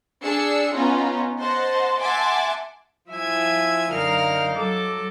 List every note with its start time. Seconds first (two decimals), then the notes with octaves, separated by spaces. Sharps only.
0.23 D4 G#4 E6 C7 C#7
0.73 B3 C#4 D#4 F4
1.39 C5 D#5 F#5 A5 C6
2.01 E5 F#5 G#5 A5 C6 D6
3.10 F3 E4 F4 E5 G#5 G#6
3.93 F#2 D3 D#4 A#4 F5 F6
4.53 F#3 A4 D6